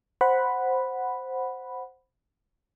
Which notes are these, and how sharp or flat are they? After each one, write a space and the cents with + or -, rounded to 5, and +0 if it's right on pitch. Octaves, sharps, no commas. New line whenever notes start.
C5 +0 F#5 +0 B5 +0